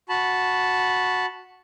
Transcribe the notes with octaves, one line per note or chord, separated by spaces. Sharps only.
F#4 A5 B5